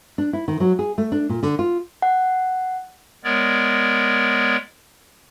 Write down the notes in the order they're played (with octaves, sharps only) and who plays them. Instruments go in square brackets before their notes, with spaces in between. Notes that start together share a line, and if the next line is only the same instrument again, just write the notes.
[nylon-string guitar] D4
E4
D#3
F#3
G#4
A3
D4
A#2
D3
F4
[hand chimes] F#5
[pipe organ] G#3 B3 A#4 C#5 D5